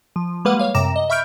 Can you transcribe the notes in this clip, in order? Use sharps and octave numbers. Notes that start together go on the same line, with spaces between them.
F3
G3 G#3 A#3 B4 F5 F#5
C#5 F5
F#2 C3 A#5 D6 A#6 E7
D#5
E5 B5 C#6 F6 G6 D7